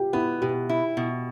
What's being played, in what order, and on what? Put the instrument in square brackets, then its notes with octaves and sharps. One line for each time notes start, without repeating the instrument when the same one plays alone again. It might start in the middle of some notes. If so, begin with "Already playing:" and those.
Already playing: [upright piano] F4 G4
[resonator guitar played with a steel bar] B3 [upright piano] E4
[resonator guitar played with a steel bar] B2 [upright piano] G4
[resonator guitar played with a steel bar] E4
B2